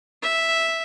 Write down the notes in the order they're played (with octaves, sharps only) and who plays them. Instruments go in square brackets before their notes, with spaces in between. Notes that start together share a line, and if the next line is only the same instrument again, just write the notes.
[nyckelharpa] E5